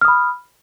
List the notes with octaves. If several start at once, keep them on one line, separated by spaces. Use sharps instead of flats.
B5 D#6 F6